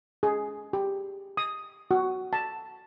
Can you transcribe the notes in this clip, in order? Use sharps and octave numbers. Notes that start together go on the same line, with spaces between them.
G#4
G4
D#6
F#4
A5